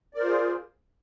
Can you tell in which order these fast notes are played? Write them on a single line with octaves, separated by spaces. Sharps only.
D5 A#4 C5 F4 G#4